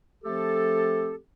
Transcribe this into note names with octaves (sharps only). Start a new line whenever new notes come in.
F3 A3 C4 G4 A4